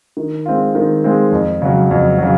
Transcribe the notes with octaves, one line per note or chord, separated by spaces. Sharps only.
D#3
G#3 C4 F4
D#3
G#3 C4 F4
F2
C#3 F#3
F2
C#3 F#3